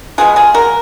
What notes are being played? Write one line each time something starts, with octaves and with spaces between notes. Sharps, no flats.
B2 G#3 B3 F4 G#4
F4 G#4
F#4 A#4